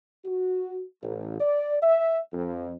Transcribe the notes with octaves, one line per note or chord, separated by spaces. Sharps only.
F#4
A1
D5
E5
F2